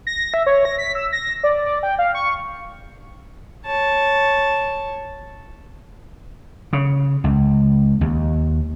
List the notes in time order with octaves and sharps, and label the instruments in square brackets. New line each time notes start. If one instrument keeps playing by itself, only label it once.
[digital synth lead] A#6
E5
C#5
A#6
B6
E6
A#6
D5
D5
G5
F5
C#6
[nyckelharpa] C#5 A5
[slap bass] C#3
C#2
D#2